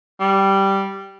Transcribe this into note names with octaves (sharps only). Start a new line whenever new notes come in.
G3